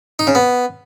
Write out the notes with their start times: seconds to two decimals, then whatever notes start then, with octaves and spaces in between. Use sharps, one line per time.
0.19 D#4
0.27 C#3
0.35 B3